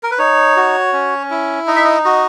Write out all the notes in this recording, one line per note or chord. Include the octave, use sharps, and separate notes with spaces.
A#4
B4
D#4 C#5
F#4
C#4
E4
D#4 D#5
E5
D#5
F#4 D#5